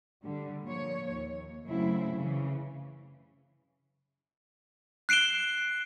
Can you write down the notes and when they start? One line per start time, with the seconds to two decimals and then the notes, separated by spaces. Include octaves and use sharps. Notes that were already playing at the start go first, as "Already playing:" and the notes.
0.23 D3 G3
0.63 A#2 F3 C#5
1.11 D#2
1.67 F#2 C#3 F#3 A3 C4 E4
2.16 C#3 E3
5.09 F#6 C7 D7 E7 G7